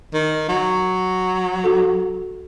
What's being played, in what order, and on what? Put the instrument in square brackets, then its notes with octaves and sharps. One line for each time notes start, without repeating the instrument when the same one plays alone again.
[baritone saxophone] D#3
F#3
[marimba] F#4 A4